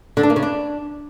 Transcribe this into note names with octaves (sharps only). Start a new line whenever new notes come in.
D3
D4
A#3
C#3
D4